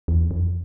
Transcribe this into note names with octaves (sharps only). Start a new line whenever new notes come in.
E2
F2